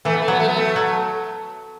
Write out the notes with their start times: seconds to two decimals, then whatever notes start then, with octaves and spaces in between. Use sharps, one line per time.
0.05 E3 A3
0.14 B3
0.22 A3
0.28 F#3 B3
0.39 A3
0.48 B3
0.57 A3
0.76 F#3